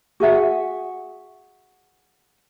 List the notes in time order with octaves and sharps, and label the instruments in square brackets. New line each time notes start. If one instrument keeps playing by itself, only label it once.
[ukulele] F#4 G#4 E5 F#5